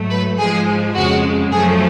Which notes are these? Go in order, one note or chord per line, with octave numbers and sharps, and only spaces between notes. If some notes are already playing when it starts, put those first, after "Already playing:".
Already playing: G#2 F#3 A3
B4
G#2 F3 G#3 G#4
F2 C#3 G#3 F#4
F#2 F3 A3 G#4